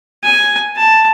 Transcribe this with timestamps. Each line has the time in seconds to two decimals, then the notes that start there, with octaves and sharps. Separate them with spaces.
0.23 G#5
0.76 A5